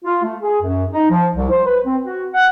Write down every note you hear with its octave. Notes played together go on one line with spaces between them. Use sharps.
F4
A3
G#4
F#2
D#4
F3
C2
C5
B4
C4
F#4
F#5